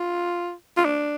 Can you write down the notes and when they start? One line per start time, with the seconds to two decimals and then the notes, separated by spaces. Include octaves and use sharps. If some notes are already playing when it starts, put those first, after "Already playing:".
Already playing: F4
0.77 F4
0.85 D4